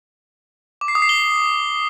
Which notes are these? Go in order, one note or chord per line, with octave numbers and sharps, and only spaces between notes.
D6
C7
D#6
C7
G7